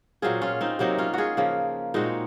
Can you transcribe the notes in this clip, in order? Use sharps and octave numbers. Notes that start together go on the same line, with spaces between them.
A#2 F#3 C4 F4 G#4
C#4 F4
C4 D#4
C3 F#3 A#3 C4 D#4
C#4 F4
F4 F#4 G#4
C#3 F3 A#3
A#2 G#3 C4 D#4 F#4